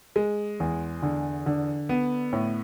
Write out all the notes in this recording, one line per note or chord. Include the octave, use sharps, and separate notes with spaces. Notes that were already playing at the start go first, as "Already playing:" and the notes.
G#3
E2
D3
D3
B3
A2